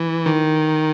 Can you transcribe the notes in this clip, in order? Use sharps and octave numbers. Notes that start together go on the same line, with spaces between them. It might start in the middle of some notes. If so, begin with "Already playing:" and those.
Already playing: E3
D#3